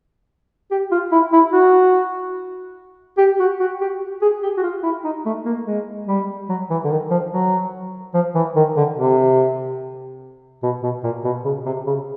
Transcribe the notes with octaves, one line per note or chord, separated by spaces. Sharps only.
G4
F4
E4
E4
F#4
G4
F#4
F#4
G4
G#4
G4
F#4
F4
E4
D#4
A3
A#3
G#3
G3
F#3
E3
D3
D#3
F3
F#3
F3
E3
D#3
D3
C3
B2
B2
A#2
B2
C#3
C3
C#3